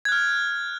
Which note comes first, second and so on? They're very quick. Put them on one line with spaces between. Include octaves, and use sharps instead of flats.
G#6 F#6 F6